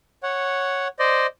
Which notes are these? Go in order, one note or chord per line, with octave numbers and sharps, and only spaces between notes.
C#5 F#5
C5 D5 D#5